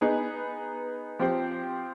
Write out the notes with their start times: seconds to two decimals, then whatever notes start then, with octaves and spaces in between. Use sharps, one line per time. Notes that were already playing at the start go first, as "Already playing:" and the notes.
0.01 B3 D#4 G#4 B4
1.19 F3 C4 G4 C5